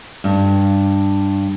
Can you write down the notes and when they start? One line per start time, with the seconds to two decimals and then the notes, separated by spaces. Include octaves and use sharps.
0.24 G2